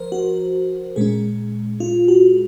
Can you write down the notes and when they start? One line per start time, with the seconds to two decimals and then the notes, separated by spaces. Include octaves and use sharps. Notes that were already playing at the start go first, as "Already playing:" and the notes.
Already playing: F3 A#4 C5
0.12 F#4
0.96 A#2 G#3 C#4 G#4
1.80 F4
2.08 F#4